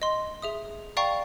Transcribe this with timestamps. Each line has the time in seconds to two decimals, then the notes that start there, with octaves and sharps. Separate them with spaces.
0.02 D#5 C6
0.42 G#4 E5 D#6
0.97 D5 F5 G5 A#5 C#6